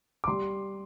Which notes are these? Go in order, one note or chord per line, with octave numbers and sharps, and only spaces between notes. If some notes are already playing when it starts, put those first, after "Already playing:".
D6
G3 C6